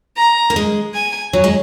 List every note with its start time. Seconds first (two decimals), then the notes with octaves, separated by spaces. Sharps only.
0.17 A#5
0.50 A#3
0.56 G#3
0.94 G#5
1.33 F#3
1.44 G#3